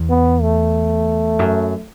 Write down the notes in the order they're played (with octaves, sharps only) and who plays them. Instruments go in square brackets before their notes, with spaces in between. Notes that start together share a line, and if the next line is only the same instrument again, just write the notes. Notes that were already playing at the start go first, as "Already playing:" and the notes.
Already playing: [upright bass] E2
[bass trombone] B3
A3
[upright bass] F#2